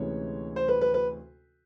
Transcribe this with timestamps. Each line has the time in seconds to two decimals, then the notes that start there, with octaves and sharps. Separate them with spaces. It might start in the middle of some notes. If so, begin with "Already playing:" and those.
Already playing: D2 C3 E3 G#3 C#4 C#5
0.56 C5
0.68 B4
0.81 B4
0.94 B4